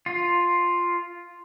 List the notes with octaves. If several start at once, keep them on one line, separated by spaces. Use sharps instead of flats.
F4